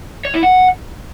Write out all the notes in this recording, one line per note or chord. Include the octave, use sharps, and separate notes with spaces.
C#5
E4
F#5